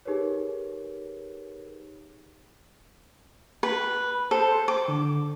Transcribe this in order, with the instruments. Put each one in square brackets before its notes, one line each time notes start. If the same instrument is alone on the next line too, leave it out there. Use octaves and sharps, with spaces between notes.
[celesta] D#4 G4 G#4 A#4 B4 C#5
[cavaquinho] B4
[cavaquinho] A4 [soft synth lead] C5
[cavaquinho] D6
[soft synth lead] D3